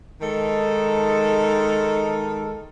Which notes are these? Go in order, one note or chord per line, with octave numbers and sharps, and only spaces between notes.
D#3 G#3 D#4 A4